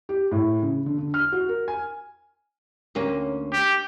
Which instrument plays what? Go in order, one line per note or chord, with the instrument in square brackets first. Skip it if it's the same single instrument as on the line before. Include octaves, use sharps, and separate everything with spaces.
[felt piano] G4
A2
C#3
D3
D3
F6
F#4
A#4
G#5
[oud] D2 A#3 C#4
[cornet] G4